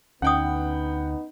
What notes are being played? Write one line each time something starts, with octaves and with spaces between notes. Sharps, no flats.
D2 B3 C#4 D#4 F#5 G5 D#6